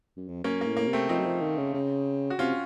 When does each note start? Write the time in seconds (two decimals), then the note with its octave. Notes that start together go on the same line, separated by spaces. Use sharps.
0.17 F#2
0.28 F2
0.44 F#2 A#3 C#4
0.61 A2 A#3
0.77 A#3
0.87 C3
0.93 A3 C4
1.09 F3 C4 D#4
1.18 F#3
1.25 F3
1.41 D#3
1.58 C#3
1.74 C#3
2.30 F#4
2.39 C3 C#4 F4